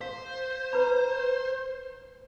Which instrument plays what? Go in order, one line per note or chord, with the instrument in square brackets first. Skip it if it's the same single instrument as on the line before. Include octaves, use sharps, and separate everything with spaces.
[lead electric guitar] C5 [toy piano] F5
[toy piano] B4 A#5 B5